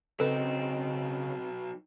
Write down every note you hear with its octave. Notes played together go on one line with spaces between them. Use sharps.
C#3 F#3 C4 D#4 A4 B4